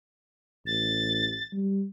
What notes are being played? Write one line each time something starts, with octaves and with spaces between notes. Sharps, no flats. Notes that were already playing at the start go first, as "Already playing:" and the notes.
A1 A6
G3